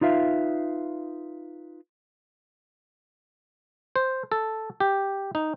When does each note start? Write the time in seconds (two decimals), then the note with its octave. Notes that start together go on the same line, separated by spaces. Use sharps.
0.01 D#4 F4 B4 E5 F5
3.96 C5
4.32 A4
4.80 G4
5.35 D#4